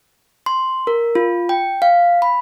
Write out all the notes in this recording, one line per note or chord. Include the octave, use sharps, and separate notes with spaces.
C6
A#4
F4
G5
F5
B5